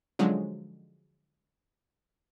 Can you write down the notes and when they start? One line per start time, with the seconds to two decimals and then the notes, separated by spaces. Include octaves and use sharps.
0.19 D3 F3 F#3 G#3 C#4